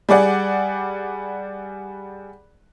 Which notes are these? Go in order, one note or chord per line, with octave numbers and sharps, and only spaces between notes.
G3 G#4 D5 F#5